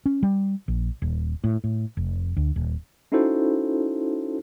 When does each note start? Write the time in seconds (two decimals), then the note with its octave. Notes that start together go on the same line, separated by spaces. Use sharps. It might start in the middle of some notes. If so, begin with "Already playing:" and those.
0.06 C#4
0.23 G3
0.68 A#1
1.02 D#1
1.44 A2
1.64 A2
1.97 F1
2.37 D2
2.56 D#1
3.12 C#4 D#4 E4 F#4 A4 C5